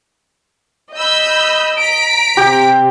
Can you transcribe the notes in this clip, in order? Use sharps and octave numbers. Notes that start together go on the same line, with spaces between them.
D#5 B5 E6 G6
A#5 B6 D7
C3 G4